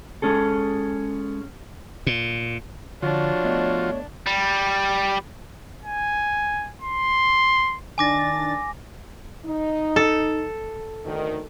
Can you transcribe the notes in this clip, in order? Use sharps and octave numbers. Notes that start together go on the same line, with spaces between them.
G#3 C#4 G#4 A4
A#2
D3 F3 D4 F4 F#4 C#5
A3 B3 D#5
G3
G#5
C6
D#3 D4 G#5 D6 A6 A#6
D#4
A4
D2 D#3